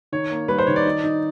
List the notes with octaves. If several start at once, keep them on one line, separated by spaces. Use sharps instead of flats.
D#3 C#5
A#3
G3 B4
C5
D#3 C#5
D5
D#4
D#4